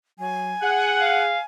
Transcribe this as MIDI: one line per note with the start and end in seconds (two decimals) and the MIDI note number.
0.19 0.55 54
0.19 1.46 80
0.62 1.34 68
0.62 1.19 78
1.01 1.39 77